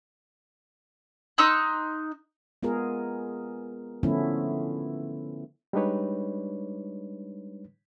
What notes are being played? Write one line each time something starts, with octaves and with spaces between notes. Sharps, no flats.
D#4 C6 E6 F#6
G#3 B3 F4 G#4 A#4
D3 F3 A3 B3 C#4 E4
G3 G#3 D4 D#4 B4 C#5